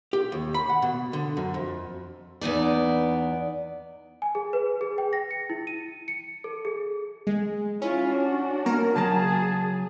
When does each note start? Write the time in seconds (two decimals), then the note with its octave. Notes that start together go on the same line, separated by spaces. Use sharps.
0.13 G4
0.32 D#2
0.54 B5
0.69 F#5
0.82 B2
1.13 D3
1.37 F#2
1.54 F2
2.41 E2 B3 D#4 D5
4.22 G#5
4.35 G#4
4.53 B4
4.81 G#4
4.98 G5
5.13 A#6
5.31 C#7
5.50 E4
5.67 D#7
6.08 C#7
6.44 A4
6.65 G#4
7.27 G#3
7.82 C#4 E4 F4
8.11 D4 F#4
8.66 A#3 A#4
8.96 C#3 F#3 G#4 A5 A#5